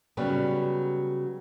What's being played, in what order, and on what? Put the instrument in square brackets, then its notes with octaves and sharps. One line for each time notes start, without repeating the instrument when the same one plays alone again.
[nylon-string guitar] C#3 F#3 G3 B3